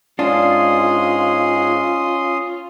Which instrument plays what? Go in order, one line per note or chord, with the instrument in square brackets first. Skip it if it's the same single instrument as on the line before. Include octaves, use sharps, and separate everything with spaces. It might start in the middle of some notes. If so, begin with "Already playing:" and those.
[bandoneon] G#2 G#3 G#4 [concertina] C#4 C6 D#6 [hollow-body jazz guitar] D4 [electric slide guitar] F4